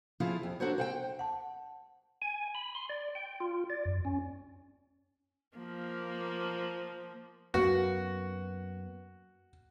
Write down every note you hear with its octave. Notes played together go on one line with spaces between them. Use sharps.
F3 E4 F4 G#4
F2
D4 F#4 A4 A#4 C5 C#5
C5 F#5 G5
F#5 A5
G#5
B5
C6
D5
G5
F4
D5
F#2
C#4
F3 A#3
F#2 A#3 B3 F#4